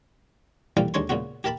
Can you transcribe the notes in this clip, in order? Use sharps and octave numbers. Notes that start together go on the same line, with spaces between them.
C2 A#2 E3 G3 A4 F5
D#2 G#3 D4 A4 C#5 C6
A#2 C#3 G#3 B3 F#4
G4 A#4 E5 A5 B5